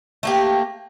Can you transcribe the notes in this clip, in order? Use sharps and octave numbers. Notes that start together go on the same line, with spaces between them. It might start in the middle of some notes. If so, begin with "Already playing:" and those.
A3 A#3 G4